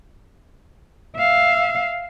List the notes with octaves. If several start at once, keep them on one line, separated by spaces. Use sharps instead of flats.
E5 F5